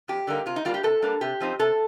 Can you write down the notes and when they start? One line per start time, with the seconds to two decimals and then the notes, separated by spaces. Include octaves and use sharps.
0.08 F2 G4
0.27 D3 G3 A#3 D#4
0.46 C3 F4
0.56 D#4
0.65 G3 A#3 D4 F4
0.74 G4
0.83 C3 A4
1.02 G3 A#3 D4
1.21 C3 G4
1.40 F3 C4 D#4
1.59 C3 A4